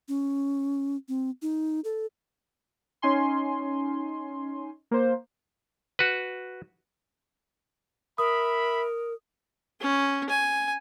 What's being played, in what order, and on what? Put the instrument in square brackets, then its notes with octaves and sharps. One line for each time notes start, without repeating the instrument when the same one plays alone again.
[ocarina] C#4
C4
D#4
A4
[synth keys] C#4 D#4 G#5 C6
A#3 C5
[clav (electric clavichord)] F#4 B4
[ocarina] A#4 [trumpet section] E5 B5 [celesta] D#6
[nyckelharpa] C#4
G#5